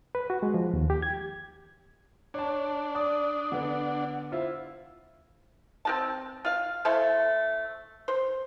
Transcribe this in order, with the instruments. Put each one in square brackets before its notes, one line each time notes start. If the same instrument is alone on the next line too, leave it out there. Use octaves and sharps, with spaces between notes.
[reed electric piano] B4
F#4
G#3
F3
D#2
G4
G#6
[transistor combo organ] D4 [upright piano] C#5 A5
[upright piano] D5 [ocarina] D#6
[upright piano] D3 B3 [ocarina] F#5
[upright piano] E4 F4 [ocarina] C5
[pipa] C4 F#4 A5
F4 F5
A3 E4 A4 C5
C5